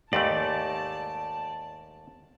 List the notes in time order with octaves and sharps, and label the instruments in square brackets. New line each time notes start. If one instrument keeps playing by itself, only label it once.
[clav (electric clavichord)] D#2 G#2 A3 [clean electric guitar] G4 D#5 [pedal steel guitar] D5 [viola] A5